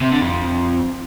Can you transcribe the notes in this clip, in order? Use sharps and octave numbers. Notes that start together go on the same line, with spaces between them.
C3
D3
F2